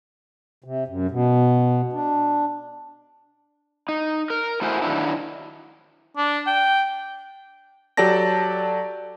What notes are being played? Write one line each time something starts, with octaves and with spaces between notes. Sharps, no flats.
C3
F#2
B2
D4
D#4
A#4
A3 E4 F#4 G#4 C5 G#5
D#3 F3 F#3 D4 E4
D4
G5
F#3 G4 A4 D5 A5 A#6